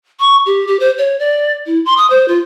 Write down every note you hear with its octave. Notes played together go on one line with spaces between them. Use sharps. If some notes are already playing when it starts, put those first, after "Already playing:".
C#6
G4
G4
C5
C#5
D5
E4
C6
D#6
C5
F4